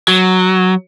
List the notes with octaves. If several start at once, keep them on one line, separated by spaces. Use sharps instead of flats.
F#3